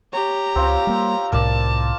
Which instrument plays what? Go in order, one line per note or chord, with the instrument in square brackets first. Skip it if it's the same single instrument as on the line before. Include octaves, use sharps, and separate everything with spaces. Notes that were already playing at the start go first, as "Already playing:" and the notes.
[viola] G4 A#5 [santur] C#5
[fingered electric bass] C#2 [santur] C4 F4 C#5
[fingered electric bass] G3 A#3
[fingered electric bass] C2 A2 C3 [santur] A#4 D5 [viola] A5